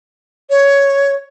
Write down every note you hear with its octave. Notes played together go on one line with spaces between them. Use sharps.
C#5